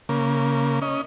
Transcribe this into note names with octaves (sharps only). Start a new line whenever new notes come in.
C#3 A#3
C#4 D#5